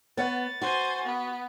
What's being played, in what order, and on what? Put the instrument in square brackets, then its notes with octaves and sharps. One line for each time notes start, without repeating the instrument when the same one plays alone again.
[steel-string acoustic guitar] B3 [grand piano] B4 C#5 F#5 [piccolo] A6
[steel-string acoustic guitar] F#4 [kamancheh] C5 G#5
[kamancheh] B3